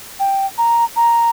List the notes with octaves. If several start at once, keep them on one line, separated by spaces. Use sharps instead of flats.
G5
A#5
A#5